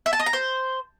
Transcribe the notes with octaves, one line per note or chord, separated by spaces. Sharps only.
E5
A5
D#5
A#5
C5